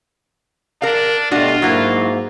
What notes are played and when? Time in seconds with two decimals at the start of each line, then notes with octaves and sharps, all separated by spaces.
0.82 D4 A#4 F5
1.31 B2 G3 A3 D4 F4 F#4
1.62 G#2 F#3 A#3 E4 F#4